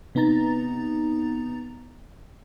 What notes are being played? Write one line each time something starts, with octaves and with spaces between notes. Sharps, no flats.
C3 B3 D#4 A#5 A6